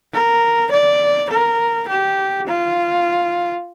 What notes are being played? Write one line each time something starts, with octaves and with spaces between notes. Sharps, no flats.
A#4
D5
A#4
G4
F4